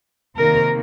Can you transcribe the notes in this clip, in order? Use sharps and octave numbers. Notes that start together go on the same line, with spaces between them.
C3 D#3 A#3 A#4